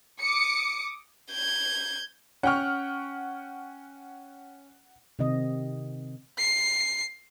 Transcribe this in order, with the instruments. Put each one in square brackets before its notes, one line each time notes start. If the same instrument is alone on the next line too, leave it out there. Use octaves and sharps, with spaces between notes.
[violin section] D6 D#6 C#7
[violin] G6 G#6
[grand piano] C#4 G5 C#6 [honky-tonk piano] F#5 F6
[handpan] C3 D#3 C4 D#5
[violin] C7